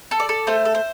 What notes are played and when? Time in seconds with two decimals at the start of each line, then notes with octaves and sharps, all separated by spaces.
0.11 A4
0.20 D5
0.29 A4
0.47 A3 C5
0.65 A4
0.75 C5